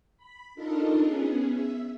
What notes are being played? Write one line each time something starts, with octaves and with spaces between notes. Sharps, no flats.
B5
D4 D#4 F4 A4 A#4 D#5
B3 C#4 G#4
E5